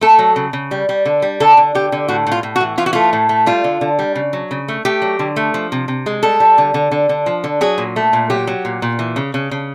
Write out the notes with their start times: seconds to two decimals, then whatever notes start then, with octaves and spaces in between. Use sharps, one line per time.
0.01 A3 A4
0.19 F#3
0.36 C#3
0.53 C#3
0.71 G3
0.89 G3
1.06 D3
1.22 G3
1.40 D3 A4
1.57 D3
1.75 D3 G4
1.92 D3
2.08 A2 F#4
2.27 A2
2.32 F4
2.43 A2
2.56 F#4
2.61 E3
2.78 E3 F4
2.86 F#4
2.93 A3 F4
3.13 A2
3.29 A3
3.46 G3 F4
3.64 D3
3.81 D3
3.99 G3
4.15 C#3
4.33 F#3
4.51 C#3
4.68 A3
4.85 A3 G4
5.02 F#3
5.19 D3
5.36 A3
5.54 F3
5.72 C3
5.88 C3
6.06 G#3
6.23 G3 A4
6.40 G3
6.58 D3
6.74 D3
6.91 D3
7.09 D3
7.26 F3
7.44 D3
7.61 F#3 G#4
7.78 A#2
7.96 A3
8.13 A#2
8.30 F#3 G4
8.47 F#3
8.65 A#2
8.82 A#2
8.99 E3
9.16 C#3
9.34 C#3
9.51 C#3